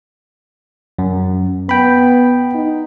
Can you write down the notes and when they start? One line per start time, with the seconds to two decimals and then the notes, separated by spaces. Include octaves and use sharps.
0.99 F#2
1.69 B3 G5 B5
2.55 D#4